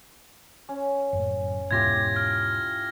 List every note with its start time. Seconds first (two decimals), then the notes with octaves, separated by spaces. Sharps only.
0.69 C#4
1.13 F#1 F#2 A2
1.71 E2 G#2 B2 E4 F4 G4 G#6 A#6
2.16 F6 A#6